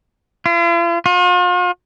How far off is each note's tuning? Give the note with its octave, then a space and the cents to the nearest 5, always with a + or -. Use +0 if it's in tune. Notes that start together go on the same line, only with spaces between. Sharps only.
F4 -45
F4 +45